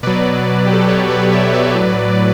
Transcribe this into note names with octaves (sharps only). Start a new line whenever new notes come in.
B2 F#3 B4 D5
G4
A4
B4
B2 F#3 A4 C#5
B4 D5
C#5 E5
B4 D5
A2 F#3